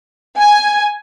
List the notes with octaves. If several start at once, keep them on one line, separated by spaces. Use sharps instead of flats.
G#5